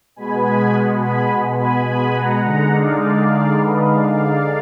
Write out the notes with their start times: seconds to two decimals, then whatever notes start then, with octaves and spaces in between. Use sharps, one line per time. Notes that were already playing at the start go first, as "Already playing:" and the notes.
0.16 B2 G#3 B3 G#5 B5
0.44 G#5 B5
1.01 G#5 B5
1.58 G#5 B5
1.86 G#5 B5
2.15 F#5 A#5
2.43 D3 G#3 D#4 F#5 A#5
2.71 D5 F5
3.00 D5 F5
3.57 B4 D#5
3.85 D5 F5
4.13 D5 F5